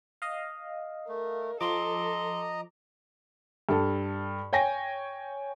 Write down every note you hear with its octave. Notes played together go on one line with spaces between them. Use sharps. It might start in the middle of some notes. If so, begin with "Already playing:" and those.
D#5 F5
A3 A#4
F3 A4 D#5 A#5 C6 D6
G2 A4
C#5 G5 G#5 A#6